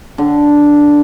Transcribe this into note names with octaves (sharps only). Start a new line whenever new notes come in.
D3